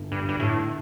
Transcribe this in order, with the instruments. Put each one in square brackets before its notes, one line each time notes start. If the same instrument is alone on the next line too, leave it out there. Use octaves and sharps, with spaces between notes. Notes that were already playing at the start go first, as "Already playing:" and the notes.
Already playing: [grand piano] G1
[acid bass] G2
G2
A2